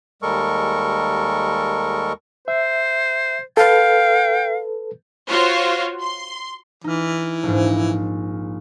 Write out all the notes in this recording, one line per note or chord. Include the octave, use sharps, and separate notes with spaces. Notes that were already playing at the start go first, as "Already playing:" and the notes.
D#2 G3 G#3 A4 A#4 C#6
C5 E5
A4 B4 F5 G5
F4 F#4 C5 C#5
C6
E3 D#4 F6
A#1 G#2